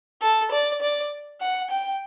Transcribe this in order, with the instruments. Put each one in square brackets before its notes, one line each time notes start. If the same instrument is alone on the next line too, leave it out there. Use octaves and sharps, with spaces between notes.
[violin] A4
D5
D5
F#5
G5